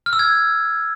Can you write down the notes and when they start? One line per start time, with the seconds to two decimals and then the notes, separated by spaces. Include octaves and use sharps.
0.06 F6
0.13 E6
0.19 G#6